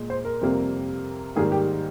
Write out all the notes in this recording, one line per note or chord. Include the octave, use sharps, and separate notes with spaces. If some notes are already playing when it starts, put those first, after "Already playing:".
Already playing: A#2 G#3
C5
A#4
F2 C3 G3 A#3
G#2 D#3 G3 A#3 G#4
G4